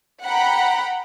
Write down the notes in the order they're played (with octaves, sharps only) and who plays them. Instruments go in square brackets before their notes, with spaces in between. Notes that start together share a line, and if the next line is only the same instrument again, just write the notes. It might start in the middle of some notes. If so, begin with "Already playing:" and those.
[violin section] F#5 G5 A#5 B5